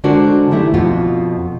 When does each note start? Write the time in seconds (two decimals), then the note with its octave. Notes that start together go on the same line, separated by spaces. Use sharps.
0.04 D3 G#3 D4 F#4 A#4 C5
0.51 D#3 G3 A3 D#4 E4 G4
0.74 F2 B2 F4 F#4